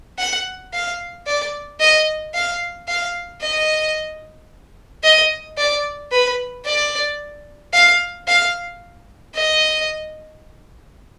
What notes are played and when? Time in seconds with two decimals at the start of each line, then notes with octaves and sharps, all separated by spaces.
0.18 F#5
0.73 F5
1.27 D5
1.80 D#5
2.34 F5
2.88 F5
3.41 D#5
5.03 D#5
5.57 D5
6.12 B4
6.65 D5
7.73 F5
8.27 F5
9.35 D#5